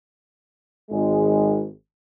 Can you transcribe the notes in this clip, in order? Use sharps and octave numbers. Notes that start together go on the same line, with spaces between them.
G#1 G#3